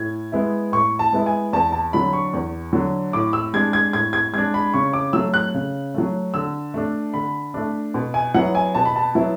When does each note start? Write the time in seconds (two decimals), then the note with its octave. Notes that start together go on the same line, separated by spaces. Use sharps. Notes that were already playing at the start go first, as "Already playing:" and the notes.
Already playing: A2 G#6
0.32 G#3 B3 E4
0.72 A2 C#6
0.99 A5
1.13 G#3 B3 E4
1.26 G#5
1.53 E2 A5
1.72 A5
1.93 D3 F#3 B5
2.13 C#6
2.33 E2
2.73 D3 F#3
3.13 A2 D6
3.33 E6
3.54 G#3 D4 G#6
3.73 G#6
3.93 A2 G#6
4.13 G#6
4.33 G#3 D4 G#6
4.54 B5
4.74 C#3 C#6
4.93 D6
5.13 F#3 A3 E6
5.34 F#6
5.54 C#3
5.94 F#3 A3
6.34 D3 E6
6.74 A3 D4
7.14 D3 B5
7.54 A3 D4
7.94 B2
8.14 G#5
8.34 F#3 B3 E4 F#5
8.55 G#5
8.75 B2 A5
8.85 B5
8.96 A5
9.15 F#3 B3 E4